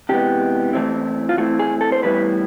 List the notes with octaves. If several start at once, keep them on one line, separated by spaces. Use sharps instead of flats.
C3 E3 G#3 B3 G4
E3 A3 C4 E4
F4
E3 A3 C4 E4 F#4
G#4
A4
C5
A2 E3 G3 B3 E4 B4